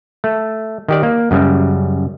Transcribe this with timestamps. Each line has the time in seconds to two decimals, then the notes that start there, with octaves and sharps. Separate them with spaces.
0.24 A3
0.88 D#3 G4 D5
1.03 A#3
1.31 F#2 C#3 G3